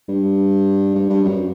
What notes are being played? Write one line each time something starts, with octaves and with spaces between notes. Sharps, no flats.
G2
G2
G2
F#2